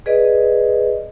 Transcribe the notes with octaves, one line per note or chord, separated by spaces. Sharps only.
G#4 B4 D5 D#5